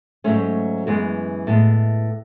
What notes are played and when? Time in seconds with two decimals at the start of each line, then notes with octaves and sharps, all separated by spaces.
0.24 G#2 F#3 A3 C#4
0.87 F#2 E3 G#3 B3
1.47 A2 G#3 B3